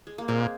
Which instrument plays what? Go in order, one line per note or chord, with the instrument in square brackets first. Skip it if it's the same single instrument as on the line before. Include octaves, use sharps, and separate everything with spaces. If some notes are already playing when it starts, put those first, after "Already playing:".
[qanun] G#3
A#3
[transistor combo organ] A#2 [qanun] G#3 C4